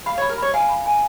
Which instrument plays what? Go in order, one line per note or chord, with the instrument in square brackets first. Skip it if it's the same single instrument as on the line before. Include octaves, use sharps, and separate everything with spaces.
[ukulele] F5 [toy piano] B5
[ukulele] C#5 [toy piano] B5
[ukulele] A#4
[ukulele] C#5 [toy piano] B5
[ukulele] F5 [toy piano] G#5
[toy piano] B5
G#5